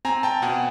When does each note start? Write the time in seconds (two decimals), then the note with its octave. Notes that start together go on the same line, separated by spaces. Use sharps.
0.05 C4 G#5 A#5
0.23 G5 A5
0.42 B2 F#5 G#5